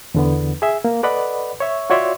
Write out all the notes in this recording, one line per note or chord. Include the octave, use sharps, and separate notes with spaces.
E2 D3 B3
G#4 E5
A#3
A4 B4 D5 D#5 F#5 B5
C#5 E5 C#6
F4 F#4 C#5 D5 E5 C6